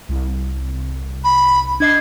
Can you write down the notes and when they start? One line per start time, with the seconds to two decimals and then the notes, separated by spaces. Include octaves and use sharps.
0.09 C2
1.24 B5
1.80 D4 D#5 G#6 C7